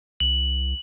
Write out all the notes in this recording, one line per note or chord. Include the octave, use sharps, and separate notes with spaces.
C2 F#7